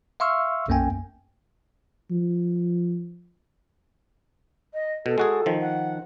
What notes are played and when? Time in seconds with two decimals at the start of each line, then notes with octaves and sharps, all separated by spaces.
0.20 E5 F5 C6 C#6 E6 F6
0.68 B1 F#2 A#3 C#4 G5 G#5
2.11 F3
4.74 D#5
5.06 B2 A4
5.18 G#3 F#4 G#4
5.46 D#3 F3
5.61 F#5